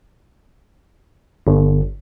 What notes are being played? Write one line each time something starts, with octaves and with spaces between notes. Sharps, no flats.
G1